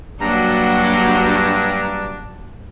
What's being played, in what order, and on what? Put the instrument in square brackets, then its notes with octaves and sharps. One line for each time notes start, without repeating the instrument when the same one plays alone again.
[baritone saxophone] G2 [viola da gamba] F#3 A#3 F#4 [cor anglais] D4 [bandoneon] A#5